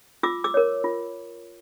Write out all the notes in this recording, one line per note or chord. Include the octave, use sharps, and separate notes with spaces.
F4 D6 E6
D6 E6
A#4 C#5
F4